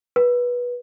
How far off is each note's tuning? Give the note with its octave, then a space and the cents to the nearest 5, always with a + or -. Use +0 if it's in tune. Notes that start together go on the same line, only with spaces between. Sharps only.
B4 -20